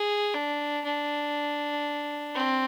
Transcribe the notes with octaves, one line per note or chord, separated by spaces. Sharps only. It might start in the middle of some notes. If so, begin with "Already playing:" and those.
Already playing: G#4
D4
D4
C4